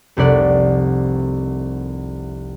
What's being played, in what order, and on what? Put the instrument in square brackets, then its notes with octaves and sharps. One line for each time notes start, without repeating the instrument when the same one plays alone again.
[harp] F1 C2 C3 D5 F#5